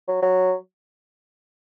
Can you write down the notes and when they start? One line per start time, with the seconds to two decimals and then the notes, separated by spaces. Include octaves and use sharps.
0.08 F#3
0.22 F#3